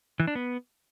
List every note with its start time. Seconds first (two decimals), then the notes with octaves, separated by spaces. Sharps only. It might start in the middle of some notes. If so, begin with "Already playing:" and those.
0.20 E3
0.27 D4
0.35 B3